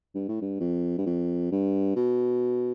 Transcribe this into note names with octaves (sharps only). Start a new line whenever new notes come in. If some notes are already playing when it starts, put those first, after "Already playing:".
G2
A2
G2
F2
G2
F2
G2
B2